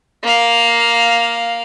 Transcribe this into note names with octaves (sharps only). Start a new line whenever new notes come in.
A#3 F5